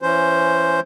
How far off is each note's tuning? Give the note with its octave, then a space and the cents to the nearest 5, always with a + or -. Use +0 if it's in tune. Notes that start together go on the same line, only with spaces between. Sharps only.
E3 +25 C#4 +0 C5 +0